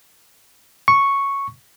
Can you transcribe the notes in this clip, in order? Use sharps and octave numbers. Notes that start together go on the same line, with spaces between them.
C#6